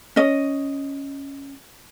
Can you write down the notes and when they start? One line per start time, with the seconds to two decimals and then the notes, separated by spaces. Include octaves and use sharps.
0.16 C#4 D#5